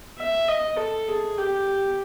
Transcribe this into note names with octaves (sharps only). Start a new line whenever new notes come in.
E5
D#5
A4
G#4
G4